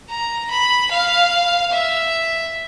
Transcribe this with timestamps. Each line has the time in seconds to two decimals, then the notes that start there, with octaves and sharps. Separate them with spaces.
0.09 A#5
0.50 B5
0.91 F5
1.72 E5